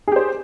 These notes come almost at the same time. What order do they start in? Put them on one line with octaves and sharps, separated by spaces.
G#4 G4 C5